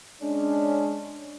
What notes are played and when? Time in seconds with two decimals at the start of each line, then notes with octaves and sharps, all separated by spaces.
0.22 G#3 C#4 D4